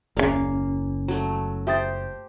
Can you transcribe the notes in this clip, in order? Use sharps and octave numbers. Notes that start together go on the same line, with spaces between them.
F#1 D#2 A#2 A#3 C#4 G#4 D5 F5
F#3 A3
G4 C5 E5 D#6 A6